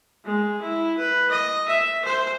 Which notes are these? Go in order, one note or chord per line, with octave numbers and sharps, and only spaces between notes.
G#3
E4
B4
D#5
E5
C5